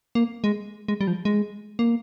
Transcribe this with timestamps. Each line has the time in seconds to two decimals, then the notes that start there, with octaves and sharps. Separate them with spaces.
0.15 A#3
0.44 G#3
0.88 G#3
1.01 G3
1.07 F3
1.25 G#3
1.79 A#3